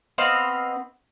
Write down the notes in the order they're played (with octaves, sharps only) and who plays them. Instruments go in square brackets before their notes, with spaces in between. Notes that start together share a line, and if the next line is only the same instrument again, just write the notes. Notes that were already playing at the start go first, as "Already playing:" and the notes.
[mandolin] B3 C4 D#5 F5